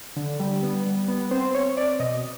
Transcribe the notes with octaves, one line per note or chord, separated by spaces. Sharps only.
D3
G3
B3
G3
B3
C4 C5
C4 C#5
C4 D5
B2 D#5